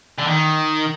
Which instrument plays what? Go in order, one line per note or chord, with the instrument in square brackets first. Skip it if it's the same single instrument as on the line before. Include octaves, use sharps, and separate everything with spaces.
[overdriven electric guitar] D3
D#3